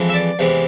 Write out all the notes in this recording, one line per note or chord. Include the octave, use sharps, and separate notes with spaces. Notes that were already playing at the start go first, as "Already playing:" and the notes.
Already playing: F2 E3 G#3
E5
D5
E2 C3 E3 G#3